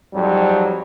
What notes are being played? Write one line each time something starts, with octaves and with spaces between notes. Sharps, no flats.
F2 G#2 F#3 G3